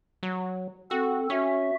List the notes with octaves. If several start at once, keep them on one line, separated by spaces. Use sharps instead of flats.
F#3
C4 F#4 A4
C#4 F#4 E5